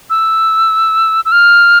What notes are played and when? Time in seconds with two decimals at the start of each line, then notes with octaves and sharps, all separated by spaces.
0.10 E6
1.25 E6
1.32 F6